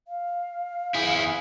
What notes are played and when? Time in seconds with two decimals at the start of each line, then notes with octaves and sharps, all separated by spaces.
0.08 F5
0.94 E4 G#4